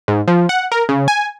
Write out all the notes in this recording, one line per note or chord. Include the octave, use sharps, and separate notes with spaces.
G#2
F3
F#5
A#4
C#3
G#5